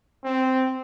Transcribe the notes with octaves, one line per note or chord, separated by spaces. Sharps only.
C4